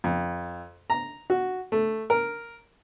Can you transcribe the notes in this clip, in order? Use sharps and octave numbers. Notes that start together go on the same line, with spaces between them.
F2
A#5
F#4
A3
A#4